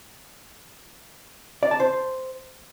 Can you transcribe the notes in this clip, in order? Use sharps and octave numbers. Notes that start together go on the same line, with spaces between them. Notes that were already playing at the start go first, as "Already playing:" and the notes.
D5
A5
C5